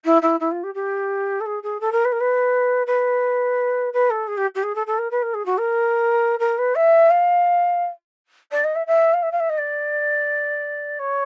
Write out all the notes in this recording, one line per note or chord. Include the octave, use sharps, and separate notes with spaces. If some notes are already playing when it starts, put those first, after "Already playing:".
E4
E4
E4
F4
G4
G4
A4
G#4
G#4
A4
A#4
B4
A#4
B4
B4
B4
A4
G#4
G4
G4
G#4
A4
A4
A#4
B4
A#4
G#4
F#4
A#4
A#4
B4
E5
F5
D5
D#5
E5
E5
F5
E5
F5
E5
D#5
D5
C#5